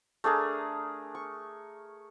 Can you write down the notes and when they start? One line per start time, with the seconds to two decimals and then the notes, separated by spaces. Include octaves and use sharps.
0.24 A3 D4 G#4 A#4
1.15 C#6